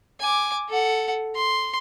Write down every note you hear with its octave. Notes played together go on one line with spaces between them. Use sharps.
G#5 D6
A4 F#5
C6